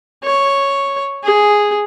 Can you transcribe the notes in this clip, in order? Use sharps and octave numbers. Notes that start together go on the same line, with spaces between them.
C#5
G#4